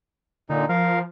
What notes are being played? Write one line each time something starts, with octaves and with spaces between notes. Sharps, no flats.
A#2 D3 D#4
F3 A#4 F5